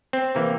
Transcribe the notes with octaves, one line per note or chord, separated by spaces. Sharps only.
C4
C3 E3 A#3